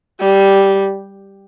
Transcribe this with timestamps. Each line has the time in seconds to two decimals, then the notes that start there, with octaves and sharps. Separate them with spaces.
0.20 G3